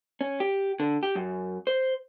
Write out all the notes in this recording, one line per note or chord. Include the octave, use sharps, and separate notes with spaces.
C#4
G4
D3
G4
F#2
C5